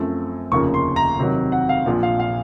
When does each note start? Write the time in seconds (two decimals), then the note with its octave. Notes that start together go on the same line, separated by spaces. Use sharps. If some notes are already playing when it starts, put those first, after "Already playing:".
Already playing: F#2 F3 A3 C4
0.52 F1 D#2 C#3 F3 A#3 C#6
0.74 C6
0.96 A#5
1.18 F2 C3 D#3 F#3
1.52 F#5
1.69 F5
1.86 A#1 A#2 F3
2.03 F5
2.20 F5